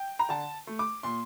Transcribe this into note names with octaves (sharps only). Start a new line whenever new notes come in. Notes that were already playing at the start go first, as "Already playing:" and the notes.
Already playing: G5
A#5
D3 A5
A3
D6
A#2 C6